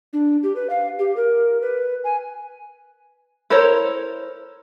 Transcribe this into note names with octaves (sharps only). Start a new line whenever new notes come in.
D4
G4
B4
F5
G4
A#4
B4
G#5
E4 A4 A#4 C5 C#5